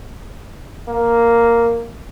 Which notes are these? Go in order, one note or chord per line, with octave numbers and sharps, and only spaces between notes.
A#3